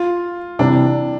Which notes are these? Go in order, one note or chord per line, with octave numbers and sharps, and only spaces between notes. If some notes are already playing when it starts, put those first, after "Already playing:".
Already playing: F4
C3 E3 G3 D4